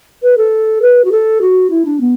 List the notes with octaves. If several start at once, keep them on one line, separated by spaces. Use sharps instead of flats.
B4
A4
B4
F#4
A4
F#4
E4
D4
B3